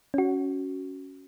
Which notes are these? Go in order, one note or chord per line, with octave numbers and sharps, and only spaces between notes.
C#4 F#4